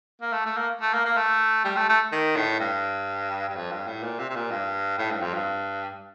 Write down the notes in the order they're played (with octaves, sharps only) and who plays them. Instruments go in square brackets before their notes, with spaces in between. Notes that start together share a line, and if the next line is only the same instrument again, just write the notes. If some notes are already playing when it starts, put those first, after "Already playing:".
[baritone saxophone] A#3
A3
A3
A#3
A3
A#3
A#3
A3
G3
A3
A3
D#3
A2
G2
G2
F2
G2
A2
A#2
C3
C3
A#2
G2
A2
G2
F2
G2